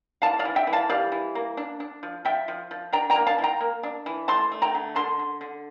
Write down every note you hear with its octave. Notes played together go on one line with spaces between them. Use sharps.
E3 F5 A5
D5 F5
E3
E5 G5
E3
F5 A5
G3 D5 F5
E3
A#3
D4
D4
F3
F3 E5 G5
F3
F3
D4 G5 A#5
G5 A#5
A#3
F5 A5
E3
G5 A#5
A#3
D4
E3
A3 A5 C6
A3
G5 A#5
D3
D3 A5 C6
D3
D3